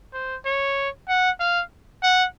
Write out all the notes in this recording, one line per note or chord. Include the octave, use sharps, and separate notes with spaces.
C5
C#5
F#5
F5
F#5